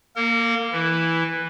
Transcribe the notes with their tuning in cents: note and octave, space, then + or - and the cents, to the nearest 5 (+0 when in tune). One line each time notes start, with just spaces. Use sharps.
A#3 +0 A#4 -40
E3 +0 E4 -5